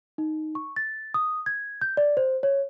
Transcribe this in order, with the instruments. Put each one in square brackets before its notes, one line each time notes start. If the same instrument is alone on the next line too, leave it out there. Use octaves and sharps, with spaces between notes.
[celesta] D#4
C#6
A6
D#6
G#6
G6
D5
C5
C#5